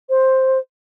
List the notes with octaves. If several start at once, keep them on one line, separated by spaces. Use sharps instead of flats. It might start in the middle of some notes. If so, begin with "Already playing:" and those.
C5